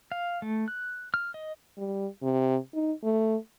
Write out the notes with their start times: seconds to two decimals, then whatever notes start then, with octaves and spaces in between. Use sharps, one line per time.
0.12 F5
0.42 A3
0.68 F#6
1.14 F6
1.34 D#5
1.77 G3
2.22 C3
2.74 D#4
3.03 A3